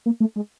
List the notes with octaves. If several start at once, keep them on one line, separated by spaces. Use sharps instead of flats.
A#3
A3
G#3